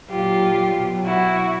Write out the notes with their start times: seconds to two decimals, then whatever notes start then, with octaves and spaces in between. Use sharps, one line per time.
0.09 A#2 F#3 F4 G4
0.73 B2 F#3
1.04 E4 F#4